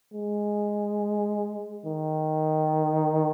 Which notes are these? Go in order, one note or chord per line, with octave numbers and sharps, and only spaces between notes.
G#3
D#3